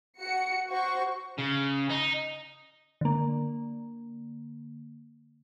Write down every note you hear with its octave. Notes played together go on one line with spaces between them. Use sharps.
F#4 C#7
F#4 C5 C#6
C#3
D#4
D3 A#3